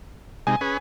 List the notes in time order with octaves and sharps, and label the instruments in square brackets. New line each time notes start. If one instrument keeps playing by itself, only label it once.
[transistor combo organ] C3 G#3 D#4 [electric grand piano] G#5
[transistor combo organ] C#4 G#4 B4